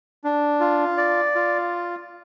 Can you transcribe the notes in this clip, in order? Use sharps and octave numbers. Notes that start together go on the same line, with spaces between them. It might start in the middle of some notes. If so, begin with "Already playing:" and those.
D4
F4
D5
F4